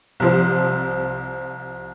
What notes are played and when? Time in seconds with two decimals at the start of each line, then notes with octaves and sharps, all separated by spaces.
0.20 C2 F3 C5